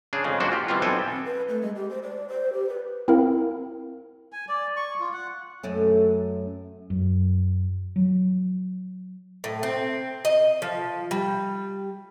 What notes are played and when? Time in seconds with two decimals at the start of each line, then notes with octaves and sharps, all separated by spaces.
0.13 C#3 D4 G#4
0.24 F2 C#3 G#3
0.40 F#3 A#3 D4 F#4 C5
0.52 F4 G4
0.68 B2 E3 G3 C4 F4
0.82 B1 B3 C4 A4 G5 G#5
1.10 C4
1.25 B4
1.49 A3
1.62 G#3
1.75 G4
1.90 C5
2.03 D5
2.28 C5
2.53 G4
2.69 B4
3.08 C4 E4 A#4 F5 F#5
4.33 G#5
4.48 D5
4.77 C#6
5.00 F4
5.13 F#5
5.63 F#2 A3 C#4
6.90 F#2
7.96 F#3
9.44 A2
9.63 C4
10.25 D#5
10.62 F3
11.11 G3